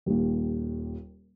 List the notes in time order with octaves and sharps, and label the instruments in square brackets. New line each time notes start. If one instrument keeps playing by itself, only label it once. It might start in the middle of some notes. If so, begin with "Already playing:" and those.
[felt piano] D#1 D#2